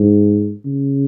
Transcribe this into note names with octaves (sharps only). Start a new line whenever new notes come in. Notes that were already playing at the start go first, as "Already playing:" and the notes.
Already playing: G#2
C#3